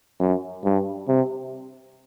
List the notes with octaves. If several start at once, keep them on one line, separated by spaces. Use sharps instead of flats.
F#2
G2
C3